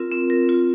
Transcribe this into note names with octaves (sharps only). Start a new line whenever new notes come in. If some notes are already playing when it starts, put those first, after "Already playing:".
Already playing: C4 F4 A#4
C4
A#4
F4